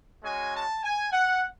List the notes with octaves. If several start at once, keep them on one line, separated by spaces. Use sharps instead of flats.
G#3 C#4 F#4 G#5
A5
G#5
F#5